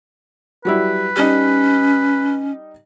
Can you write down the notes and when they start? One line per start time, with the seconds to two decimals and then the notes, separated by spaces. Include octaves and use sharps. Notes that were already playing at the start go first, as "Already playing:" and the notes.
0.65 F#3 G3 E4 B4
1.16 G3 C#4 D#4